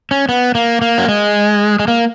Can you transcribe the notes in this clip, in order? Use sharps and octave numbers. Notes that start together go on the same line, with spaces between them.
C#4
B3
A#3
A#3
F#3
G#3
G#3
A#3